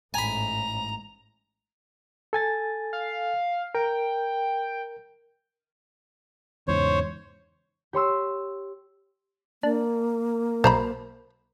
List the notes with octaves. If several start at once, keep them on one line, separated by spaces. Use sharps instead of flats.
A1 G#2 G#5 A#5 B5
A4 G#5 A6
F5
A#4 G5
E2 G#2 C#3 C5 C#5
G4 C#5 C6 E6
A#3 D4
B1 C5 A#5 B5